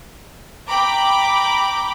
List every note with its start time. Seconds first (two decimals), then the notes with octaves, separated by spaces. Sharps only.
0.69 G5 A#5 B5 D6